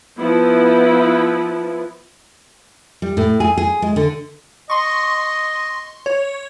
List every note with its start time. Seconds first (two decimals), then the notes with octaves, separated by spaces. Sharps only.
0.19 F3 B3 E4
3.02 G3
3.17 A2
3.40 G#4
3.57 G#4
3.82 G#3
3.96 D3
4.70 D#5 C6 C#6
6.06 C#5